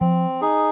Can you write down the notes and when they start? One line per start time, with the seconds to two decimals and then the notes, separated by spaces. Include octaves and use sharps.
0.01 F3 C4
0.41 D#4 G#4